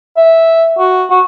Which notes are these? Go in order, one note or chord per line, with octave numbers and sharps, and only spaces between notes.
E5
F#4
F#4